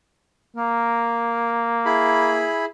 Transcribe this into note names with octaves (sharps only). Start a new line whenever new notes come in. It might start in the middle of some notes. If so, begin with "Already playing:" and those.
A#3 A#4
E4 G#4 B5